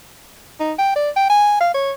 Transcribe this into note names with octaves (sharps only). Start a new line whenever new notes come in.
D#4
G5
D5
G5
G#5
F5
C#5